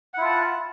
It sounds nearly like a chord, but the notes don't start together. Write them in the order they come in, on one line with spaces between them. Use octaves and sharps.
F#5 E4 F4 A5